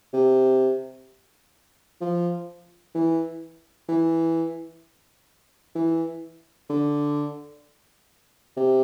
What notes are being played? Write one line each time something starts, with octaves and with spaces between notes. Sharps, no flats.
C3
F3
E3
E3
E3
D3
C3